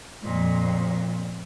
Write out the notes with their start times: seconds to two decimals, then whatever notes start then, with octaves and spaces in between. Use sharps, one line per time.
0.23 F2 A#2